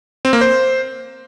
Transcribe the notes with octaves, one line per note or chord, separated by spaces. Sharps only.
C4
A#3
C5